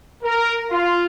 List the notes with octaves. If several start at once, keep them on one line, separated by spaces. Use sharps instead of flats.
A#4
F4